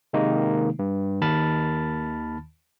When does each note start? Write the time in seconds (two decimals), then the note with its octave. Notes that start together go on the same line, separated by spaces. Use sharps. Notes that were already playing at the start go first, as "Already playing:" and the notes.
0.13 C3 D#3 G#3 A#3 D#4
0.79 G2
1.21 D#2 D#3 A5 B5 F6 A6